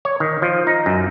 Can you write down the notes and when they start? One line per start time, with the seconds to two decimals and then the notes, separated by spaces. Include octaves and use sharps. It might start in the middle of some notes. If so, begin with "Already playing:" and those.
0.05 C#5
0.20 D#3
0.42 F3
0.67 D#4
0.86 F#2